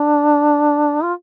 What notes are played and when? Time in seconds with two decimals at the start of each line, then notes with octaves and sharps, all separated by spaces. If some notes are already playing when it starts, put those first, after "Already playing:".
Already playing: D4
1.03 F4